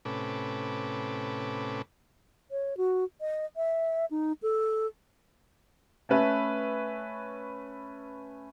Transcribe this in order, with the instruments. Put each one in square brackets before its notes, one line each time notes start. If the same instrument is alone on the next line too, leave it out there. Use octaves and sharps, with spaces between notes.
[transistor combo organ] A2 C3 C#4 A4 B4 D6
[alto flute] C#5
F#4
D#5
E5
D#4
A4
[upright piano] A3 C#4 B4 E5